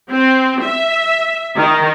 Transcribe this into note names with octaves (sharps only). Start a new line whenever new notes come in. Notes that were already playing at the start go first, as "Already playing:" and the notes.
C4
E5
D#3